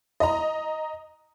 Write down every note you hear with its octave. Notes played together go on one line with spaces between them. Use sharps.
D#5 A#5